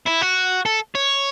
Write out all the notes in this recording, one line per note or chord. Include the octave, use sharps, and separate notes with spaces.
E4
F#4
A4
C#5